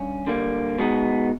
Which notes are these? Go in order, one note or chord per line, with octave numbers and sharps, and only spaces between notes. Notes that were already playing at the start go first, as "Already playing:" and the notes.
Already playing: G2 C#4
D3 G3 A#3
B2 G#3 B3 D#4